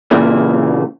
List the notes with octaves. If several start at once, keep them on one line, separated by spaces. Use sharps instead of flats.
A#2 C#3 E3 A#3